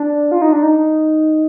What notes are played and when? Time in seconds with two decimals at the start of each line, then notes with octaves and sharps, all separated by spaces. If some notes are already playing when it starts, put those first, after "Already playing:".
Already playing: D4
0.31 F4
0.42 D#4
0.53 D4
0.63 D#4